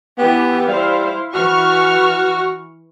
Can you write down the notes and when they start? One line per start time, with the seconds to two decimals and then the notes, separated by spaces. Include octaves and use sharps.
0.18 E3 B3 G4
0.68 G3 E4 C5 F5
1.35 E3 F#4 C#6 F6